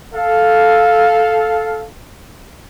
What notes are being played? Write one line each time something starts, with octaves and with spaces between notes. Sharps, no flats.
A4 F5